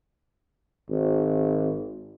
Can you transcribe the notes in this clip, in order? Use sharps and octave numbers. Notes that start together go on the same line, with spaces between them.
G#1